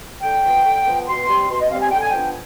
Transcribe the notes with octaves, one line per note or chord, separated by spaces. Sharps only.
D3 G5
F3 B3
D3
F3 B3
B2 C6
G3 C4
B2 C6
D#5
G3 C4 F5
G#5
D3 G5
G#5
F3 B3 D4 G5